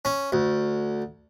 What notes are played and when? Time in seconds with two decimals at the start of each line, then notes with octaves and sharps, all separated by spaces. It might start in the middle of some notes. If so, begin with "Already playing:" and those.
0.05 C#4
0.32 D2